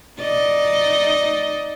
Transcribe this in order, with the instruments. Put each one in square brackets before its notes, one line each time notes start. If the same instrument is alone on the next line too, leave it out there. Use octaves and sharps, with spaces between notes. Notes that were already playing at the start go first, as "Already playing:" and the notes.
[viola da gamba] D#4 D5 D#5